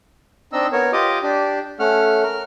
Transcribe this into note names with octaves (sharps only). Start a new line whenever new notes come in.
C4 D4 D#4 D#5 E6
B3 A#4 C#5
F4 G4 D#5 D6 D#6
D4 G4
A3 C#4 F#5 F6
A#4 F6